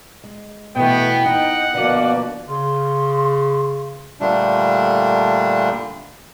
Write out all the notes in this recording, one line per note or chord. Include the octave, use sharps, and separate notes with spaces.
G#3
B2 E3 A3 B3 G5
D#4 D#5 F#5
B2 D3 F3 A#3 F#4 B4 D5
C#3 C6
A#2 D3 G3 A3 D4